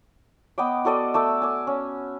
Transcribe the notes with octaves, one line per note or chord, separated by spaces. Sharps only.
B3 D#5 G5 D6
F#4 A4 D5 D#5
A3 D6 E6
G#5 D6
C#4